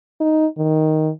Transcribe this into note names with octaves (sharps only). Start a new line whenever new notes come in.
D#4
D#3